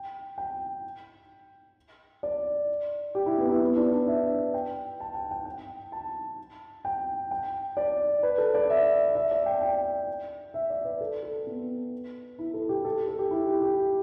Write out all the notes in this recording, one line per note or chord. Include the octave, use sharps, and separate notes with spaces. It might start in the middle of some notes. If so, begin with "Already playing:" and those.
Already playing: G5
G5
D5
G4
E4
B3
E4
B3
D4
D4
E5
G5
A5
G5
G5
G5
A5
G5
G5
D5
B4
A4
D5
E5
E5
D5
G5
G5
E5
D5
B4
A4
A4
B3
E4
A4
G4
A4
A4
G4
E4
G4
G4